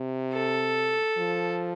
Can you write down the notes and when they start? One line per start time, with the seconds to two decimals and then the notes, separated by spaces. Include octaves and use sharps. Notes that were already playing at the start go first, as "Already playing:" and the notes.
Already playing: C3
0.33 A4
1.18 F3